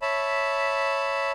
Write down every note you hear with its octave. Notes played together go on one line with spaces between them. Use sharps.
C#5 E5 A5 B5